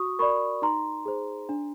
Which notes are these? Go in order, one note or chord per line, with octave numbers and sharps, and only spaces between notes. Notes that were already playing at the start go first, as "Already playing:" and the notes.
Already playing: F#4 C#6 D#6
A#4 D5 B5 C#6
D#4 A#5 C6
G#4 C5
D4